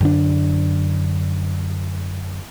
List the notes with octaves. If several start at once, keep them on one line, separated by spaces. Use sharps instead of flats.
F#2 D3 D4